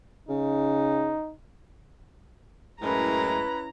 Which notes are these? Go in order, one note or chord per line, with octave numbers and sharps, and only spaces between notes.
C#3 D#4
F#2 A2 G#3 C#4 E4 B4 A#5